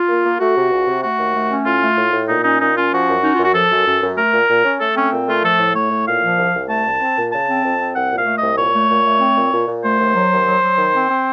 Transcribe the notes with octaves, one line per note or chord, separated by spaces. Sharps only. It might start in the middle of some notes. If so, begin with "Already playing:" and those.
Already playing: F4
A#3
A#3
A3 F#4
C3
C#2
C3
A3 F#4
D#2
A3
C#4
A2 F4
A3
A2
A2
A#2 D#4
C#4 D#4
A#2 D#4
C#4 F4
F3 F#4
F#2
C#4 D#4
F4
F#2
F#4
F3 A4
F#2
F#2
F#2
A3 A#4
A#2
A#2
C#4
A3 A4
C4 C#4
A#2
A3 F4
F3 A4
A2
A3 C#5
A2
A#2 F5
F3
C2
C2
A3 A5
C2
C4
A#2
C#3 A5
C4
F2
C4
C2 F#5
A#2
F5
A3
D#5
C2
A#2 C#5
A3
A#2
A3
C4
A#2
A#2
A#2
A3 C5
D#2
F#3
D#2
F#3
F#3
D#3
C4
C4